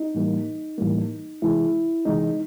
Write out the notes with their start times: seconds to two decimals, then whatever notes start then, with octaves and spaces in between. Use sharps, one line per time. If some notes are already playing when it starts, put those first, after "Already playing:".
Already playing: D#4
0.15 A2 E3 G3 A#3
0.78 A2 E3 G3 A#3
1.42 C3 E3 G#3 E4
2.05 C3 E3 G#3 D#4